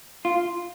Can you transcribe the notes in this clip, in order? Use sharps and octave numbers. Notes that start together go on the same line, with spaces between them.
F4